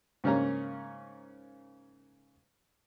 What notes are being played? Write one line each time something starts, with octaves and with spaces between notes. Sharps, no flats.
G#2 C#3 A#3 C#4 A#5